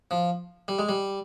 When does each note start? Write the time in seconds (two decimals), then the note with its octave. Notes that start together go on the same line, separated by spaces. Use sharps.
0.11 F3
0.68 G3
0.79 G#3
0.89 G3